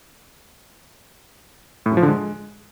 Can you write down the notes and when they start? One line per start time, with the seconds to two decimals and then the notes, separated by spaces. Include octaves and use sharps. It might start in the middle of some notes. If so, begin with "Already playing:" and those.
1.86 A2
1.91 F#2
1.97 F3
2.02 D3
2.08 G#3